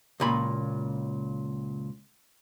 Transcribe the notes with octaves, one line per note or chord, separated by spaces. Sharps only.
C#2 A#2 B5